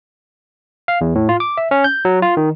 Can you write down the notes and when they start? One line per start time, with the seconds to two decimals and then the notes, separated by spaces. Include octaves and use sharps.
0.88 F5
1.01 E2
1.15 A2
1.29 F4
1.40 D6
1.57 E5
1.71 C#4
1.84 G6
2.05 F#3
2.22 F4
2.37 D#3